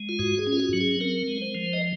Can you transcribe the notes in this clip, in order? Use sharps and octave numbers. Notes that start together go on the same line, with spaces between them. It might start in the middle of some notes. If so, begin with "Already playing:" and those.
Already playing: G#3
F4
G#2 F#4
G#4
C#4
F4
F#4
F#3
G#4
C4 A#4
G#3
C5
F3
D#5